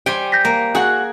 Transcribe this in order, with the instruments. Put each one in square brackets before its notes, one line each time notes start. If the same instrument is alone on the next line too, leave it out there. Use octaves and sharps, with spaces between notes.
[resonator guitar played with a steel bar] G3 C5 [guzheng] G5 G#5
[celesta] G6 A#6 B6
[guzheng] A#3
[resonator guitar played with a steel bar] F#4 F#5 [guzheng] G#4